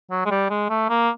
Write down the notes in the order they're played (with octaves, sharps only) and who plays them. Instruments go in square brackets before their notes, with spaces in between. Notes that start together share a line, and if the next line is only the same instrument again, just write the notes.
[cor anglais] F#3
G#3
G3
G#3
A3
A#3